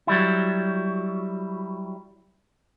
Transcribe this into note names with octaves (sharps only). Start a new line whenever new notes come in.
F#3 G3 E4